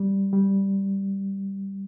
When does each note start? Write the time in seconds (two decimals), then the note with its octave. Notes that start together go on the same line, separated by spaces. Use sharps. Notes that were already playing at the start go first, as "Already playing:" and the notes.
Already playing: G3
0.33 G3